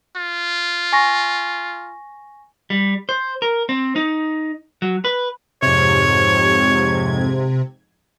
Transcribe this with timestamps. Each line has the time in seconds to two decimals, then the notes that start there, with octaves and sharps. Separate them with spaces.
0.16 F4
0.93 G#5 C#6 A#6
2.70 G3
3.09 C5
3.42 A#4
3.69 C4
3.96 D#4
4.82 F#3
5.05 B4
5.62 F2 G#2 C3 C#5 G#6